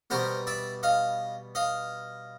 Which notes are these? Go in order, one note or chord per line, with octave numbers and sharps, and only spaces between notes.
B2 G3 B3 A#4 C5
D5 E5
D#5 F5
D#5 F5